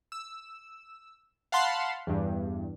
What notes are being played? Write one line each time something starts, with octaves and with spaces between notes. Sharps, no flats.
E6
F5 F#5 A5 B5 C6 C7
E2 G2